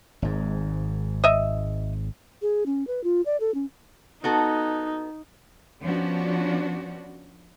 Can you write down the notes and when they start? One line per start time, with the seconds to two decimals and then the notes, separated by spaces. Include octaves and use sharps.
0.22 G#1 G#2
1.24 D#5 E5
2.42 G#4
2.66 C#4
2.87 B4
3.04 F4
3.26 D5
3.40 A4
3.54 C#4
4.24 B3 D#4 F#4 A4
5.83 F3 B3 C#4 D4 F#4